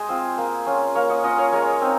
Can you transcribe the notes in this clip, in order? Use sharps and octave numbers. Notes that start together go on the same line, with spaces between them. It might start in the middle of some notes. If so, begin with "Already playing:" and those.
Already playing: G#3 G#4 C5 D#5
C4 F4
A#3
C#4 F4
A#3 C#5 F5
D#5 F#5
C#4 F4 D#5 F#5
C#5 F5
G#3 A#4 C#5
C4 D#4